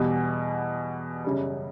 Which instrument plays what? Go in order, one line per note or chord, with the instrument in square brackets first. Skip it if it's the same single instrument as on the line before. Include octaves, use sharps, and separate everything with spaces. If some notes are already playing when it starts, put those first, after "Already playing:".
Already playing: [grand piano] E2 B2 G3
F#2 C#3 G3